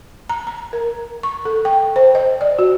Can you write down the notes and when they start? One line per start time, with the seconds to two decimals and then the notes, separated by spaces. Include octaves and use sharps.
0.29 A#5
0.47 A#5
0.73 A#4
1.23 C#6
1.45 A4
1.65 G5
1.96 C5
2.15 D#5
2.41 D5
2.59 F#4